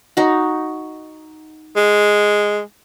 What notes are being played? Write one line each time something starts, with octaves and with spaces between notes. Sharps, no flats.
D#4 F#4
G#3